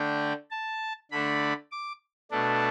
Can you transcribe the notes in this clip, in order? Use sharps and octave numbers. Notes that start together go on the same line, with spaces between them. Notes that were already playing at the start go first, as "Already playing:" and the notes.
Already playing: D3 A3 D4 G5
A5
D3 A3 D4 B5
D6
B2 A3 D4 A4